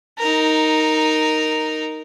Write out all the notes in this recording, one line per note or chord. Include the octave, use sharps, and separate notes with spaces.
D#4 A#4